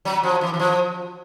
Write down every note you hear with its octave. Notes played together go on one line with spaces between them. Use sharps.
F#3
F3
E3
E3
F3